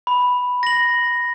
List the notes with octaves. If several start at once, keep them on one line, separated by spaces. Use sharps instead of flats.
B5
A#6 F#7